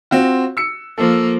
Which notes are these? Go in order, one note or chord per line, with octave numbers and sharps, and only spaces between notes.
C4 F4 F#4
E6 C#7
F3 A#3 A4